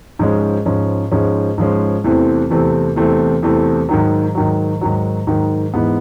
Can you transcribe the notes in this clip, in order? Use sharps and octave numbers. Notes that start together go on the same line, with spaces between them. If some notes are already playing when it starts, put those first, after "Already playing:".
G#2 F3 G#3 C#4
G#2 F3 G#3 C#4
G#2 F3 G#3 C#4
G#2 F3 G#3 C#4
E2 C3 E3 A3 C4
E2 C3 E3 A3 C4
E2 C3 E3 A3 C4
E2 C3 E3 A3 C4
G#2 D#3 F#3
G#2 D#3 F#3
G#2 D#3 F#3
G#2 D#3 F#3
G#2 E3 G#3 B3